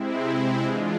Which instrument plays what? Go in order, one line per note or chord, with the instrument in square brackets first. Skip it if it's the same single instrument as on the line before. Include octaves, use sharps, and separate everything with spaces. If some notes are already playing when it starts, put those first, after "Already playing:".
Already playing: [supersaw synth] C3 G#3 C4 E4
E3 G#3 D4 F4